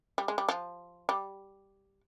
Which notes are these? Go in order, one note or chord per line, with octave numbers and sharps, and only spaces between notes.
G3
G#3
G3
F3
G3